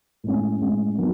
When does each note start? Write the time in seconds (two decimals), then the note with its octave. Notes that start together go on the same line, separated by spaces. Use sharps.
0.24 A2 G#3 C#4
0.61 A2 G#3 C#4
0.98 D#3 F#3 B3